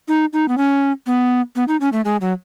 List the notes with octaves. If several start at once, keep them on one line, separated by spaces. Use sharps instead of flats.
D#4
D#4
B3
C#4
B3
B3
D#4
C#4
A3
G#3
F#3